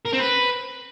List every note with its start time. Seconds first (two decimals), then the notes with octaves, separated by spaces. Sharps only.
0.05 A#4
0.13 C4
0.20 B4